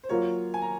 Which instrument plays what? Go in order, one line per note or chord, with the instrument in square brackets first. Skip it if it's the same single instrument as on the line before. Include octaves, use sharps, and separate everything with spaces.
[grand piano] C5
[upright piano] F#3 A#3 F4 A#4 [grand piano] C#5
[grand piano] G#5
A#5